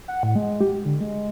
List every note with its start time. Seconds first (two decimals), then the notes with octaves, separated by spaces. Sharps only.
0.08 F#5
0.23 A2
0.36 G#3
0.61 G4
0.85 D3
1.00 G#3